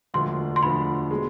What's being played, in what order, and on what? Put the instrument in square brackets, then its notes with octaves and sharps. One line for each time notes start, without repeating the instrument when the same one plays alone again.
[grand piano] E1 D2 D3 F3 [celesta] C6
[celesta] C6
[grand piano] E1 D2 D3 F3 [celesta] B5
[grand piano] B2 G#3